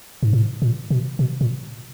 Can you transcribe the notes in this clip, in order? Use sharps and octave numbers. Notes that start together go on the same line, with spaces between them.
G#2
A2
A#2
B2
B2
A#2